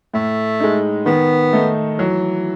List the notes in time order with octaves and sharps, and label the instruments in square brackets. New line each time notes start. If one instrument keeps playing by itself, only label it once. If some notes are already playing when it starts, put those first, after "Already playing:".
[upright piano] A2 [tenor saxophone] A3
[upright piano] G#3 D#4
[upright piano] D#3 [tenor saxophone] B3
[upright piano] A3 D#4
[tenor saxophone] E3 [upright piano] F#3